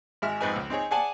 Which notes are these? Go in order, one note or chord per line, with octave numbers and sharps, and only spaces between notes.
G#1 G#3 E5 F6
F2 G#2 G#4 B4 D#5 G#5
C#2 E6
C4 D#4 G#4 C#5
G#4 D5 F#5 G#5 A5